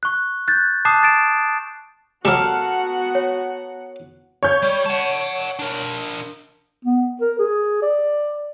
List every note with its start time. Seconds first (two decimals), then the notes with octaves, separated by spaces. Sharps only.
0.03 C#6 F#6
0.48 F#6 G6 A6
0.85 A5 D6 D#6 F#6 C7 E7
1.03 F#6 A6 D7 E7
2.25 F#3 G3 B3 F#4 A4 A#4 F5 F#5
3.15 C#5
4.43 C#5 G6
4.62 G3
4.86 F#5 A5
5.59 D4 A#4
6.85 B3
7.21 A#4
7.39 G#4
7.82 D5